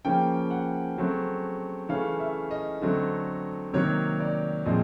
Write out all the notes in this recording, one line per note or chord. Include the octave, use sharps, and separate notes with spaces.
C#3 F3 A#3 C#4 G5
F#5
C#3 F#3 A3 C4
C#3 E3 A3 C#4 F5
E5
D#5
D3 F#3 A3 C4
C3 D#3 F#3 A#3 C#5
D5
A#2 F3 G#3 C4 D#5